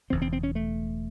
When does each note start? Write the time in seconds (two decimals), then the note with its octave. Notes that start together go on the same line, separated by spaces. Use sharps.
0.10 E1 E2 C#3 C4
0.22 C4
0.33 C4
0.43 C#4
0.55 A3